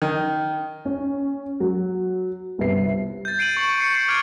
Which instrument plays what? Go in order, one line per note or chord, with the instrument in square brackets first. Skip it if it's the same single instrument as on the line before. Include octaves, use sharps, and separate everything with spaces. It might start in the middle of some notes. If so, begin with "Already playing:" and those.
[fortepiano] D#3
[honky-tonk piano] C#4
F#3
G1 C2 B3 E5 C7
[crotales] G6 A6
C7 D7 D#7 F#7
C#6 C#7 F#7
C#6 C7 C#7
C7
D6 F6 G6 G#6 D7